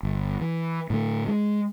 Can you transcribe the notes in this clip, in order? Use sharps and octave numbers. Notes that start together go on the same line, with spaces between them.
G1
E3
A2 D3 A3
G#3